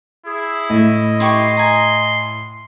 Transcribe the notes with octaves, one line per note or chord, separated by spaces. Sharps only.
E4 G#4
A2 D#5
E4 G4 C6 C#6
G#5 A#5